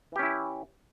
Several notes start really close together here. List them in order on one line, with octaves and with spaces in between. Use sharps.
E3 G4 C#4 E4